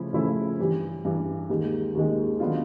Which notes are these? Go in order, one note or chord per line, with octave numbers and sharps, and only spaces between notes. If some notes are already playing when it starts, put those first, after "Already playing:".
Already playing: C#3 F3 A3 C#4 E4
C#3 F3 A3 C#4 E4
G2 E3 G3
G2 E3 G3
D#2 D#3 G#3
D#2 D#3 G#3
D#3 F#3 B3 D4 F4